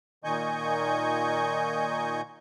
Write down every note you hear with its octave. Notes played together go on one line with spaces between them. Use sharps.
A#2 D#3 D#5 G#5 C#6 G6